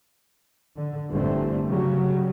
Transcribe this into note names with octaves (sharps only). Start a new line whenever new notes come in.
D3
G1 D3 E3 A3 C4
C#3 F#3 G3